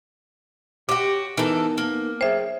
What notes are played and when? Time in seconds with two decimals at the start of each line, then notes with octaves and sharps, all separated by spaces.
0.89 F#4 G4 C#5 C6 D6
1.37 E3 B3 D#4 A4 A#4
1.78 A#3
2.21 G#4 C5 C#5 E5 G5